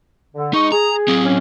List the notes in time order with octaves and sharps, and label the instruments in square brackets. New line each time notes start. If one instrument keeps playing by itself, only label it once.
[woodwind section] D3
[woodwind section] G#3 C#6 [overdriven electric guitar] D#4
[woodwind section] G#4 [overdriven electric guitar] A#5
[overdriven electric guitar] F#3 C4
[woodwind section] C#4